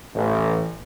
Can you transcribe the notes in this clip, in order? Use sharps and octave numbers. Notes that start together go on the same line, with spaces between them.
A1